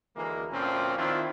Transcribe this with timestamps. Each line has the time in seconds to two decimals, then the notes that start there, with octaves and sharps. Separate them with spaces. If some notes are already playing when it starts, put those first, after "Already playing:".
0.16 D2 E3 G#3 A#3
0.52 D2 A#2 F3 C4 C#4
0.98 D#3 C4 D4 E4 F4